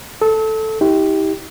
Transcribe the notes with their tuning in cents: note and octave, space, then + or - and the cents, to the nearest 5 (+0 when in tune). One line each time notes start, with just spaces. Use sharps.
A4 +0 E6 -40
E4 -45 G4 +0